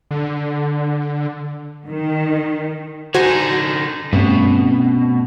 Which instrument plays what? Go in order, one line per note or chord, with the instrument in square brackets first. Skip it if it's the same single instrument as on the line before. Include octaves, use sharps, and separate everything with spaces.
[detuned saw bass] D3
[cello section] D#3
[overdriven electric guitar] D3 D#4 [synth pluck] F#4 C5 G#5
[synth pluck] G2 [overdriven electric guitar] B2 [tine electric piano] A3 C4 C#4